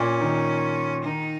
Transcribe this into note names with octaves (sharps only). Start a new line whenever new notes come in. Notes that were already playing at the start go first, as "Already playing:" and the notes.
Already playing: A#2 C#4
D#3
D#3 D#4